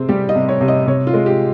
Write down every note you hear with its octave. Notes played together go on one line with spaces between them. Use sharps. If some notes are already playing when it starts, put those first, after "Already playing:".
Already playing: C3 C4 G#4
G3 G4
D#5
C3
C#5
C3
D#5
C3 C#5
F4
G#3
G4